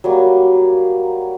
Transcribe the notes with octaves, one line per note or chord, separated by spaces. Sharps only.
F#3 G3 A#3